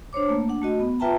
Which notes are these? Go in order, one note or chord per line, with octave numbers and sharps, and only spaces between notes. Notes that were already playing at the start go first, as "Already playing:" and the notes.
D4 C5 C#5 D6
A3 A#3
D4 F#5
A3 F#4 D#5
B3
F4 B4 E5 G5 A5 A#5